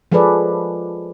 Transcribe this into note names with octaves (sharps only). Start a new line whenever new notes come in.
F3 G#3 G#4 A4 B4 D5